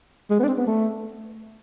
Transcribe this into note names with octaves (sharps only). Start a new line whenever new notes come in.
G#3
B3
D4
C4
B3
A3